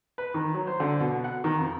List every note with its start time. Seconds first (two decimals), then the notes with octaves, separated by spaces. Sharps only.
0.18 B4
0.34 D#3
0.54 F#3
0.67 C5
0.80 D3
1.00 B2
1.24 F#5
1.44 D#3
1.57 F2